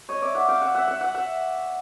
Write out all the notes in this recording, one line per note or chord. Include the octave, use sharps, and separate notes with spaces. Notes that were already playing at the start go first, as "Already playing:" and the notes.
C#5 D#5
D5 E5
E5 F#5
F5 G5
E5 F#5
E5 F#5
E5 F#5
E5 F#5
E5 F#5